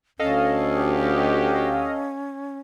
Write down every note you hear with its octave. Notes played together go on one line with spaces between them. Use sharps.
D2 C#4 A4 D#5 F5
F#4 G4